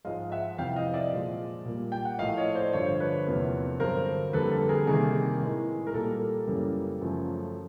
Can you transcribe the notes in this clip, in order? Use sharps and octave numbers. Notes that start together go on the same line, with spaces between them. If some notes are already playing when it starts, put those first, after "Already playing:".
G#2 F3 G#3 D#5 F5
E5 F#5
F2 C3 E3 F5 G5
D#5 F5
D#5
D5 E5
A#2 F3 G#3
A#2 G3 A#3
G5
F#5
A2 F3 A3 D#5 F5
C#5 D#5
C5 D5
G2 D3 F3 C#5
C5
B4 C#5
E2 C3 F3 A#3
G2 D3 F#3 A#4 C5
F2 D3 G3 A#3 A4 B4
A4
G#4 A#4
C3 D#3 G3 A#3 G#4
A2 E3 G#3
A#4
A#2 G3 A#3 A4
F#2 C#3 E3 G3 A#3
F#2 C#3 F3 A3